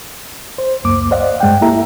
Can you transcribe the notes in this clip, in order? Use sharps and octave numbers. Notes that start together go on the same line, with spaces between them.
C5
C#2 F#2 A#3 D6
C5 D5 D#5 F5 F#5
G2 G#3 F#5 G5
A#3 E4 G4 A4 E5 A#5